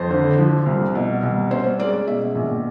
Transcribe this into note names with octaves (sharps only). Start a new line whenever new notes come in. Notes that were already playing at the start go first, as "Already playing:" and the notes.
Already playing: F2 C5
D3
F3
C2
B2
C2
C#4 C5
G#3 D5
B2 E5
A#1